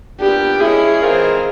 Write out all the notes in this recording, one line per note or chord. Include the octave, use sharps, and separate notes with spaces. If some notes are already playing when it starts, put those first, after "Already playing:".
A#2 G3 B3 D4 G4
G#3 C#4 E4 G#4
E3 G#3 C4 F4 A#4